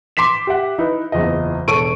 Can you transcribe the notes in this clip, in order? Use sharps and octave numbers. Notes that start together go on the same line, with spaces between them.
C6 D6 B6 E7
G4 E5 F#5
D#4 E4 B4
F#1 E2 F4 D#5
E1 A4 C#5 C#6 D7 D#7